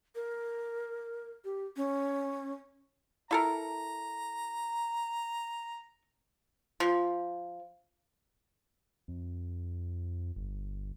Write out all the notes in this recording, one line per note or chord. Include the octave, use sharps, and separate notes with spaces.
A#4
G4
C#4
E4 A4 A#4 A#5
F3
F2
G1